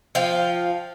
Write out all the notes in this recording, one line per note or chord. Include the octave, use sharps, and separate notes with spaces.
F3 F5 G5